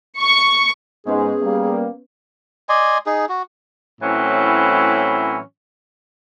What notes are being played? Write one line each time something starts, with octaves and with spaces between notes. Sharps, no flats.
C#6
G#2 G#3 B3 C#4 G#4 B4
G3 A#3
D5 D#5 G#5 C6
D#4 G#4
F#4
A2 E3 F#3 C4 C#4 E4